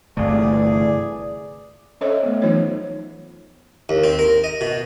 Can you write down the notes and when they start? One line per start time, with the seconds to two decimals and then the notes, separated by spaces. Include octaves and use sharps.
0.17 G1 C3 E3 A3 G#4 D5
2.01 C#4 A4 C5 C#5 D#5 E5
2.23 A3 B3
2.42 E3 F#3 D#4 F4 C5 C#5
3.89 D#2
4.04 C4
4.19 A#4
4.44 D#5
4.61 B2